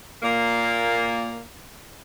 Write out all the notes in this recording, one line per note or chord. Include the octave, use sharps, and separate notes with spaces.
A#2 A#3